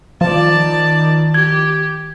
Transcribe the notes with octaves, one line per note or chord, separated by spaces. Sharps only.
D#3 F3 F4 D5 A5
G4 G#6